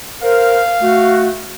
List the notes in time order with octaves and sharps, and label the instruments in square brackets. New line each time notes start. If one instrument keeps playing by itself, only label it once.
[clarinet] A#4 [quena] C5 [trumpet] F5
[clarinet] A3 [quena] F#4